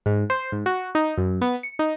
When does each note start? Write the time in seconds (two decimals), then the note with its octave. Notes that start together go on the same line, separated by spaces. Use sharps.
0.06 G#2
0.30 C5
0.52 G#2
0.66 F#4
0.95 D#4
1.18 F#2
1.42 B3
1.63 C#7
1.79 D#4